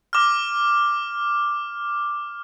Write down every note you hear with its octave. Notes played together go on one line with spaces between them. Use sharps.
D6 F6